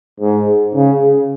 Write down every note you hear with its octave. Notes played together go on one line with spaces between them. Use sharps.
G#2
C#3